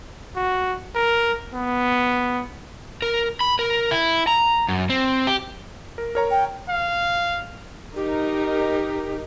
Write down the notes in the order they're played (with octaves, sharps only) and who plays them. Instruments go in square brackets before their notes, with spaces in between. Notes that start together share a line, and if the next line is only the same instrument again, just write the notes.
[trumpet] F#4
A#4
B3
[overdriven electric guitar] A#4
B5
A#4
E4
A#5
F#2
C4
G4
[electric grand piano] A#4
A#4 C#5 A#5
[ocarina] G5
[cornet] F5
[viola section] D#4 A#4 [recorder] G4